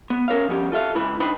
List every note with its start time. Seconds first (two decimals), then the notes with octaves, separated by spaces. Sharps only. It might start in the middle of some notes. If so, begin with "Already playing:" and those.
0.10 B3
0.28 C#4 A#4 C#5 F5
0.48 F3 G3 B3 C#4 G4
0.72 F4 A4 E5 F5
0.95 C#2 E4 B4 B5
1.20 D4 D#4 B4 C5 G5 B5